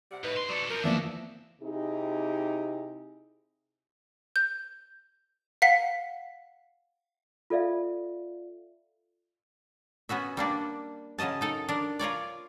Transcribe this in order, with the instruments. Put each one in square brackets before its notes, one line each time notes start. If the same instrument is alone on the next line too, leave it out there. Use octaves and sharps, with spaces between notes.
[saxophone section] C3 G3 F#5
[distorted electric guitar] A2 [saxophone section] D#4 B4
[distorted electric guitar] F#2 C6
[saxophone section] B2 D5 [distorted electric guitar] F#3 A4
[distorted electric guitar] C2 F3 [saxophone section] A#4
[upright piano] E3 F3 [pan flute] A#3 [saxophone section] D4 [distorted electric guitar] F#4 E5
[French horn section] C3 D#4 E4 G4 G#4
[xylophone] G6
F5 F#5 B6 C7
[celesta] F4 A4 D5 E5 F5
[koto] B3 C#4 F#4 E5
G3 A#3 D4
C#3 F#3 C#4 D#5 A5
D#4 A4 A#4
D4 A#4
F4 A#4 C#5 D5